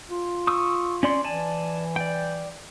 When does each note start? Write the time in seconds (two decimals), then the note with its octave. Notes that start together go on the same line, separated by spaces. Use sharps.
0.09 F4
0.47 C#6 D#6 E6
1.03 C#4 D5 C6
1.24 E3 D5 G#5 A5
1.96 D5 G5